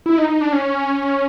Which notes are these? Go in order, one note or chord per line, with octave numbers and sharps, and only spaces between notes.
E4
D#4
D#4
D4
C#4